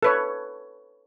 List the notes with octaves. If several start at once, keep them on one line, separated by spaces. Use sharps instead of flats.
A4 B4 C#5